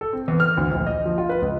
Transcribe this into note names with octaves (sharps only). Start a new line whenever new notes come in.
A4
C4
E2
F6
D2
A#1
D#5
F3
F4
B4
C#2